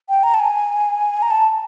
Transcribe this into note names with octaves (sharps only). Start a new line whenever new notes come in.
G5
A#5
A5
G#5
A#5
A5